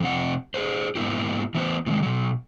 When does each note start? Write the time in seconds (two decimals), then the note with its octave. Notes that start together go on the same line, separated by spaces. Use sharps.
0.01 F2 C3 F#5
0.54 G#4 B4 C5
0.95 G#2 A#3 B3 E4 G4
1.55 E3 A3 B3 C#4 B4 C5
1.86 A2 C3 D#3 G#3
2.03 B2 F#3